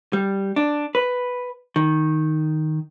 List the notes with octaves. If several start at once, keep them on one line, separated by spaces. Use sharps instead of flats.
G3
D4
B4
D#3